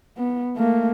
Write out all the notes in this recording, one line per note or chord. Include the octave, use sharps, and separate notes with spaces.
B3
A3 A#3